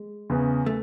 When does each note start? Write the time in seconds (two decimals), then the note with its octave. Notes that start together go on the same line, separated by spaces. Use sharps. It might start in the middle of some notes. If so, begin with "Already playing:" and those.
Already playing: G#3
0.30 E2 C#3
0.66 A3